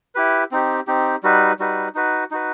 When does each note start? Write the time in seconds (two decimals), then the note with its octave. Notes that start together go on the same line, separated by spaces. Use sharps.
0.15 E4 G4 B4
0.51 C4 D#4 G4
0.87 C4 D#4 G4
1.23 G3 D#4 F#4 B4
1.59 G3 D#4 F#4 B4
1.95 D#4 F#4 B4
2.31 D#4 F#4 B4